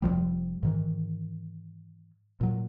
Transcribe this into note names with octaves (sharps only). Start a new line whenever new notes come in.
F1 E2 F3 G3
G#2 D#3 E3
A#2 F#3